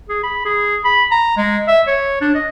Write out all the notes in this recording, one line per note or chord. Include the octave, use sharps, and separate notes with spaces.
G#4
B5
G#4
B5
A#5
G#3
E5
C#5
D4
D#5